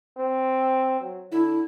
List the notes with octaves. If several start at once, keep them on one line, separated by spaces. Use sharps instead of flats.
C4
F#3
D3 E4